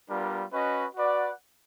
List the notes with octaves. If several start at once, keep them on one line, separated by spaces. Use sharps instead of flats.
G3 B3 D4 F4 A#4
C#4 F#4 B4 D#5
F#4 B4 D5 F#5